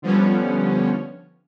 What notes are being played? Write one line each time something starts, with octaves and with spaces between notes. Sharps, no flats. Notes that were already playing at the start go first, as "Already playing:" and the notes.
D3 F3 G3 B3 C#4